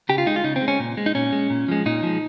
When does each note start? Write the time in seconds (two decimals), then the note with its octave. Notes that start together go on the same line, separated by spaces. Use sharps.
0.09 C#3 G4
0.18 F4
0.26 G#3 D#4
0.36 F4
0.44 C#3 D#4
0.56 C4
0.62 G#3
0.68 C#4
0.80 A#2
0.97 G#3
1.06 D#4
1.15 A#2 C#4
1.33 G#3
1.50 A#2
1.68 F3 G#3
1.86 A#2 D#4
2.03 F3 G#3